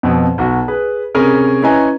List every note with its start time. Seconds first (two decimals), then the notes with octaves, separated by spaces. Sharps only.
0.03 F2 B2
0.38 B1 F#4
0.68 G#4 B4
1.15 C3 C#4 G#4 A#4 B5
1.63 C#4 E4 B4 D#5 G#5 A#5